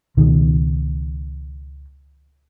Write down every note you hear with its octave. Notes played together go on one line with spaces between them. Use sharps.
C#2 B2 D#3